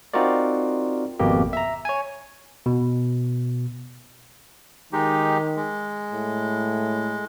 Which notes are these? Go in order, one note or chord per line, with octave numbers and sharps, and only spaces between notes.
C4 D#4 F4 F#4 A#4 D5
G#1 F2 B2 A#3 G4
E5 A#5
C#5 G#5
B2
D#3 G#3 D#4 G4
G#3
A2